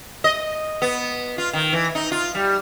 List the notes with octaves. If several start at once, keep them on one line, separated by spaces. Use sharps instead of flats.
D#5
B3
F4
D#3
E3
D#4
F4
G3